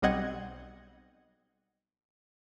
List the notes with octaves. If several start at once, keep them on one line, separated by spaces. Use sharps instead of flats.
B1 G3 C4 D#5 F#5 G#6